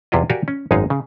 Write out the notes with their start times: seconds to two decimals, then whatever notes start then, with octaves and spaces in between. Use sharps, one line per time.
0.12 E2 C3 E4 F4 D#5
0.30 F#4 G4 A#4 D5 F5 G#5
0.48 C#4
0.71 G#1 F#2 G#3 D#4 G#4 F5
0.90 C#3